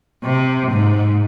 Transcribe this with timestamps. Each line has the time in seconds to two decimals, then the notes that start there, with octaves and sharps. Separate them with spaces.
0.24 C3
0.71 G#2